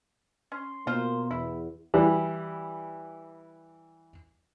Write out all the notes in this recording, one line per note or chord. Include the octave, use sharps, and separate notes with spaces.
C#4 C6
B2 A#3 F4 C5
E2 E4
E3 G3